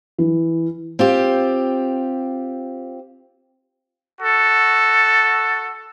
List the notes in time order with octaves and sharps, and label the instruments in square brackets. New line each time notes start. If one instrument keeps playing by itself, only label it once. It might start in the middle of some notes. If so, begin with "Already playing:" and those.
[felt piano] E3
[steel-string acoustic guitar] C4 F4 G4
[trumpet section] F#4 A4